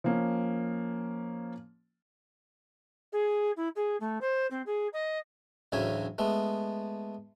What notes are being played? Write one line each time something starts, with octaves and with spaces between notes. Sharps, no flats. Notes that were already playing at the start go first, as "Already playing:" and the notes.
F3 A#3 C#4
G#4
E4
G#4
A3
C5
C4
G#4
D#5
A1 D2 C#3 F#3 E5 G#5
G#3 A3 B3